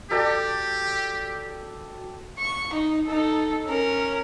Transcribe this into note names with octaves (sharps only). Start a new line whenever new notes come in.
F#4 G4 A4 D5 G5
C#6
D#4
D#4 A4
C#4 A#4